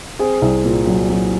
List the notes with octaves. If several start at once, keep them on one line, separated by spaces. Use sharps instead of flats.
C4 G#4
C2
A#2
F#3
F#3